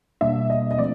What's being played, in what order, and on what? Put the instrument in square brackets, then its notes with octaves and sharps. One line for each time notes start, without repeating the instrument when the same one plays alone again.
[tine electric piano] B2 G3 A#3 D4 [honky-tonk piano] E5
[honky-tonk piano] D#5
D#5
[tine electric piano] F3 A3 C4 [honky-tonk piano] D5